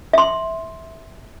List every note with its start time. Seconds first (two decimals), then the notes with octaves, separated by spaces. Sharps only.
0.13 E5 C6